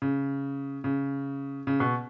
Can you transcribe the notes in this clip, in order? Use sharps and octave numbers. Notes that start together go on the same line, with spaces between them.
C#3
C#3
C#3
B2